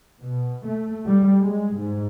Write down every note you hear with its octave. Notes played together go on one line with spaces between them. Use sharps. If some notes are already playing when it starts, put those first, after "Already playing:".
B2
A3
G3
G#3
G#2